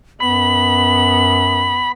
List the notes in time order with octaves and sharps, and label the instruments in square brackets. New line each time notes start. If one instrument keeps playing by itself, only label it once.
[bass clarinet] F#2 [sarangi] B3 [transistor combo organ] B5 [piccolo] F#7